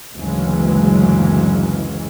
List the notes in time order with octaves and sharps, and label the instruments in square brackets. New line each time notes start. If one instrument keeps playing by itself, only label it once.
[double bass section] F#1 D2 C#3 E3 F#3 G#3